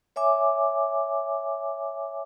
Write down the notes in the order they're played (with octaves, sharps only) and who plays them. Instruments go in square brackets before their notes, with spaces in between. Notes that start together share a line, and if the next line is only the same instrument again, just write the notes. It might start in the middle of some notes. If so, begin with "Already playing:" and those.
[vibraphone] C#5 E5 G#5 D6